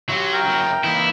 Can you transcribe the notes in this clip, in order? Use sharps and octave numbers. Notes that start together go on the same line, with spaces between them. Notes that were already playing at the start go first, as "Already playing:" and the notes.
F#3 E4 G4
A#4 G5
F#2 E4
E3 A#3 D#4 E4